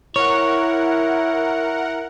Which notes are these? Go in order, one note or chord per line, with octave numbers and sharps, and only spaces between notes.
E4 A#4 C#5 F#5